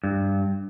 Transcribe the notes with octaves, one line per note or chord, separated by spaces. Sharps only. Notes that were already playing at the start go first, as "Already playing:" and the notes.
G2